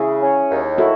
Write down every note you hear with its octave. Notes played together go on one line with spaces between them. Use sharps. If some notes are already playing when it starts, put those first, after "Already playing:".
Already playing: C#3 E4 G#4
C#4
D#2
E4 F#4 A4